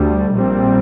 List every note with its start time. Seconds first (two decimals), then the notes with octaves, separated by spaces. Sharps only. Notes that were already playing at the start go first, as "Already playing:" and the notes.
Already playing: D2 D3 G3
0.33 A#1 A#2 G3 C4